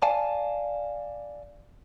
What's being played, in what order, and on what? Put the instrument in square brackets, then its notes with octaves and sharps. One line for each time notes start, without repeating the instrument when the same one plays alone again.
[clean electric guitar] D5 F5 G#5 A5